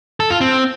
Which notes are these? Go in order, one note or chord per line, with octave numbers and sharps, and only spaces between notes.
A4
F4
C4